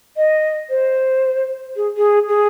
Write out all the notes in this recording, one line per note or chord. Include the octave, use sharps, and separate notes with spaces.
D#5
C5
G#4
G#4
G#4